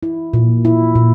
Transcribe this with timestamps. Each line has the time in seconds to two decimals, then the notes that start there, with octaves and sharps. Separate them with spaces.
0.03 E4
0.33 A#2
0.65 E4
0.95 A#2